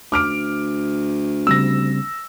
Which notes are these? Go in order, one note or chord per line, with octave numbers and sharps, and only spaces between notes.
D2 D6 F6 D7
C#3 G3 C4 E6 A#6